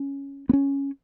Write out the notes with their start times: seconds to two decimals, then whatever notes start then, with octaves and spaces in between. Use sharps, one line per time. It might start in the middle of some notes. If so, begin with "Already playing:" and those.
Already playing: C#4
0.49 B3
0.53 C#4